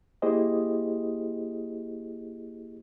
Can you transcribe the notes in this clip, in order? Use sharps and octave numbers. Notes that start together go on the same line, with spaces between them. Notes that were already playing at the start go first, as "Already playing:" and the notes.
A#3 E4 G4 G#4 C5 D#5